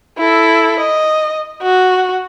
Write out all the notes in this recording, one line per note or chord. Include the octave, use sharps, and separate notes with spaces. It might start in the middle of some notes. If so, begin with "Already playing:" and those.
E4 A4
D#5
F#4